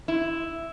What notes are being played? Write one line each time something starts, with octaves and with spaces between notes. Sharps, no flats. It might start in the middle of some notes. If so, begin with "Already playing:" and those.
E4